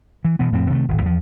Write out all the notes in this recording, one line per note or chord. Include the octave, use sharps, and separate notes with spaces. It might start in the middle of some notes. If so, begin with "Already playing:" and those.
E3
B2 E3 B3
F2 A2 F3 C4
C3 D#3 G#3 A3
D#1 G#1
E2 F3